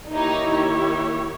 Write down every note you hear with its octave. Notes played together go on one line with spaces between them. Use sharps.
D#3 A#3 D#4 E4 G4 C#5